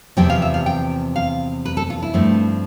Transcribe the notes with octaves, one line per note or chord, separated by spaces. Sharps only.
E2 C3 F3 C4 G5
F5
E5
F5
G5
F5
B4
A4
F4
E4
G2 F3 A3 C4